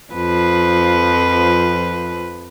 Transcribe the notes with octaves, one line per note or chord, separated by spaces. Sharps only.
F2 F3 B4